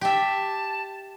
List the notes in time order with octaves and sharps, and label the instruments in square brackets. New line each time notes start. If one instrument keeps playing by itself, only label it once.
[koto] G4 E5 [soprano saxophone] A5